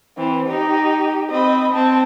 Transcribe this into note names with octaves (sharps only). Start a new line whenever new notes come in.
E3 C4
D#4 G4
C4 D#5 B5
C4 A5